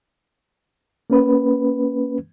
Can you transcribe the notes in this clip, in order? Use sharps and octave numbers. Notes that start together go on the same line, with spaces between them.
A#3 C#4 B4